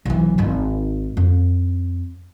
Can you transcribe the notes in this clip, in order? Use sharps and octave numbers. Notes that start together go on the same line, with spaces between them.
B1 E3
G#1 D#4
F2